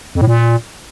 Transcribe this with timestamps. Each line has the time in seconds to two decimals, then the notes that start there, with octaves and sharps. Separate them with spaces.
0.15 F2
0.21 A2
0.27 A#2